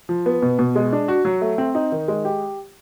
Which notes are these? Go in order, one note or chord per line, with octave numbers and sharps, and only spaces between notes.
F3
B3
B2
B2
G#3
D4
F#4
F#3
A3
C4
D#4
D#3
G#3
G4